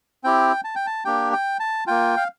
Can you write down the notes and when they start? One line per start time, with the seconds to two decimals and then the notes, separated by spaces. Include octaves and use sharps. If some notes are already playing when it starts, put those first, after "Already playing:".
0.24 C4 E4 G4 G5
0.64 A5
0.76 G5
0.86 A5
1.05 A#3 D4 G4 G5
1.33 G5
1.60 A5
1.87 A#3 F4 G5
2.17 F5